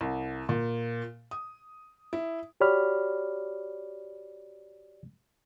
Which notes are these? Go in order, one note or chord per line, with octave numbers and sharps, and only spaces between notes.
C2
A#2
D#6
E4
F#4 G4 C#5 D5 B5 F6